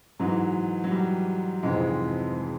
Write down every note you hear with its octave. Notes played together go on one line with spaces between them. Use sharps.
G#2 E3 F#3
F#3
G3
F2 G#2 C3 E3 G#3
G#3